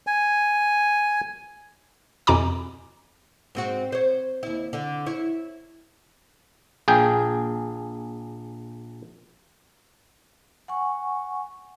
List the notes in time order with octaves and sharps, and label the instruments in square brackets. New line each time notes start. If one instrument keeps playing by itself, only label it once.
[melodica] G#5
[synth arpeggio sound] F2 B2 E4 G#5 A#5 D6
[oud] G#2 C4 F#4
C5 C#5
D#2 E4
D3
E4 C#5
[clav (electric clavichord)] A#1 G#4 G5
[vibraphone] F#5 G#5 C#6